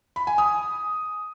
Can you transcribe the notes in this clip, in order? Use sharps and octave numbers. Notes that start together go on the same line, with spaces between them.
B5
G#5
D#6